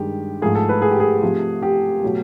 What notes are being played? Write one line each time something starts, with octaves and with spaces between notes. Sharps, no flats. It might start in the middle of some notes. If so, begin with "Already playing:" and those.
Already playing: G2 D#3 G#3 G4
G#2 F3 A3 G#4
A4
B4
G#4
G4
G#4
C3 F3 A3
G4
B2 F#3 A3